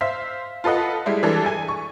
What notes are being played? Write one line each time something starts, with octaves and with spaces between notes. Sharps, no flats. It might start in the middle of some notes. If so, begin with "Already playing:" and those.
C5 E5 F5 B6
F4 A4 B4 D#5 F#5
G3 G#3 E4
E3 G3 G#3 D4 A4
G#5
C#6